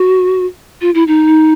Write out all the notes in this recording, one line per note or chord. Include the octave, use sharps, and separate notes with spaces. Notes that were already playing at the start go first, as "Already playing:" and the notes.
Already playing: F#4
F4
E4
D#4